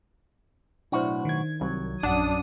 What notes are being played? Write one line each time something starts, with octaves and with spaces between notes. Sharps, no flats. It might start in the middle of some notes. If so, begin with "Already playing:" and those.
B1 A2 D4 E4 F#4 C5
D#3 G#6
C2 F#3
A#1 F#2 D4 F#5 D#6